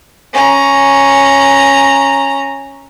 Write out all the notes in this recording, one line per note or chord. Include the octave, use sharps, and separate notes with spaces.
C#4 A#5